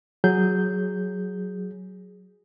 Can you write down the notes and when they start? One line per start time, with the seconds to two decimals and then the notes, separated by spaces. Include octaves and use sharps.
0.24 F#3 G#4 G6